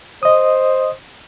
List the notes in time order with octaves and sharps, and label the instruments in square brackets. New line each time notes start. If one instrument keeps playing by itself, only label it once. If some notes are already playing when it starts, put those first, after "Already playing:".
[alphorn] C5 [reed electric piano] D#5 D#6